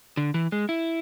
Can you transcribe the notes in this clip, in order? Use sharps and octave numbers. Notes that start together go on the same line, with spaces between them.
D3
E3
G#3
E4